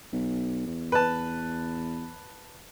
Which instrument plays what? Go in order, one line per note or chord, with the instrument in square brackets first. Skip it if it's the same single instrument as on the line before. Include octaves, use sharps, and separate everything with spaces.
[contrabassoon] B1
E2
[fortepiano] B4 A5